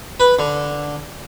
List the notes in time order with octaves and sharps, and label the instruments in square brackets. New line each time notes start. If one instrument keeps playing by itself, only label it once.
[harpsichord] B4
D3